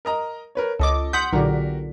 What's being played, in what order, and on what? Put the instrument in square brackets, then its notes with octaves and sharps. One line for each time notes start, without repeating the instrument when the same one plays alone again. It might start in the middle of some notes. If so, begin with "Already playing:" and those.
[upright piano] A#4 D#5 A#5
A#4 B4 C#5
[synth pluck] C#2 D6 [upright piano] A4 D#5
[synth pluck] F#5 G6 [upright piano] C6 D#6 B6
[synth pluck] B1 A#2 D3 [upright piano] F#4 G4 A#4